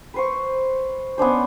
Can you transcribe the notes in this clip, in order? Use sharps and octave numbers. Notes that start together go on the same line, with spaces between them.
B4 C5 C#6
B3 C#4 D4 C5